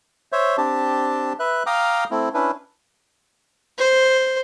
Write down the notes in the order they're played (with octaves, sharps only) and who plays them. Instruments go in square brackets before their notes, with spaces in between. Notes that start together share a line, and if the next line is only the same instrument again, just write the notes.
[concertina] C5 C#5 E5
C4 D4 G4 A5
B4 E5 F#6
F5 G5 A#5 D6 D#6 F6
A3 C4 E4
C#4 D4 E4 B4
[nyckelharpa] C5